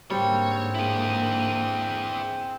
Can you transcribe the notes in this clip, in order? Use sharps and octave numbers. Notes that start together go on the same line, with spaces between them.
G#2 D3 G3 A#3 C4 C#5
E4 G#4